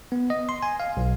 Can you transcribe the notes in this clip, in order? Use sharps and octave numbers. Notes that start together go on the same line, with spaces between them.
B3
D#5
C6
G#5
F5
B1